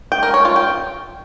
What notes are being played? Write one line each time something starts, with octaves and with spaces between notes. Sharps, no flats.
G5
A#4
C#5
F4
G5